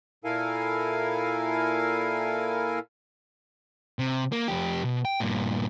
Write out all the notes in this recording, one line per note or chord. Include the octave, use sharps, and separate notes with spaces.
A#2 E4 A4 A#4 F5 G#5
C3
A#3
F2 G4
B2
G5
G2 A#2